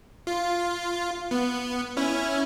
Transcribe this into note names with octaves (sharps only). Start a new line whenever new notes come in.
F4
B3
C#4 E4